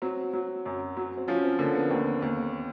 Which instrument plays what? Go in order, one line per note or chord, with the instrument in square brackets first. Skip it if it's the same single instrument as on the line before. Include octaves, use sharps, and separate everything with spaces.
[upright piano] F#3 [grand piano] C4
[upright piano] F#3
F#2
F#3
[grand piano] C4
[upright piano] F3 [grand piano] C#4
[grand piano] C4
[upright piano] D3 [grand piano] A#3
[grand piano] B3
[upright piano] D#2 [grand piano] C4
[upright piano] D#2